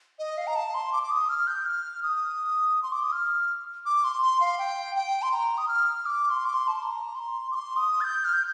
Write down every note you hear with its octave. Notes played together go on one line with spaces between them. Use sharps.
D#5
F5
A#5
A5
C6
D6
D6
D#6
F6
G6
F6
D#6
C6
D6
D#6
F6
D6
C6
C6
F5
G5
G5
C6
A#5
D#6
F6
D6
C6
D6
C6
A5
C6
A#5
C6
D6
C6
D#6
A6
G6
F6
G6